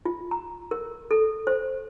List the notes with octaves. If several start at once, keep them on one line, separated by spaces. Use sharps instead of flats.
F4
A#5
A#4
A4
C5